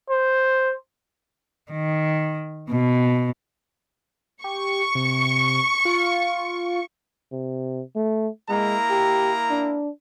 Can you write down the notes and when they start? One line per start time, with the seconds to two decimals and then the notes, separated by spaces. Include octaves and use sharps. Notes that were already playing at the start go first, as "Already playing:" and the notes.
0.10 C5
1.71 D#3
2.71 B2
4.44 G4 C#6
4.95 C3
5.85 F4
7.32 C3
7.96 A3
8.49 G#3 A#3 E4 A#5
8.90 G4
9.50 D4